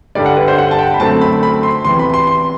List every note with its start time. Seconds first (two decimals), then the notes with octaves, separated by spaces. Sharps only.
0.15 G2 D3 G3 D5
0.26 F#5
0.36 B4
0.48 C5
0.58 F#5
0.71 A5
0.79 G5
0.94 B5
1.00 F#2 D3 A3 C4 A5
1.21 B5
1.43 B5
1.63 C6
1.85 E2 C3 E3 C6
1.99 B5
2.14 C6
2.27 C6